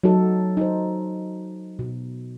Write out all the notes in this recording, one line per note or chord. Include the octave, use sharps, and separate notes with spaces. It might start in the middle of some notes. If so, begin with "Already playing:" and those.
F#3 D#4 F#4 A4
D#4 C5
B2